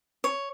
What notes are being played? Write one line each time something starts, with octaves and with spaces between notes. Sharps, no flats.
C#5